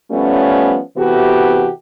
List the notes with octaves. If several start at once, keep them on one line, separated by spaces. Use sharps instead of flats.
F3 G3 A3 B3 C#4
C3 E3 B3 F#4 G4 A4